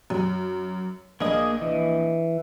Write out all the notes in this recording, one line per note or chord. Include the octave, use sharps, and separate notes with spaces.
F#2
A#1 A#3 D4 G#4 D#5 D#6
E3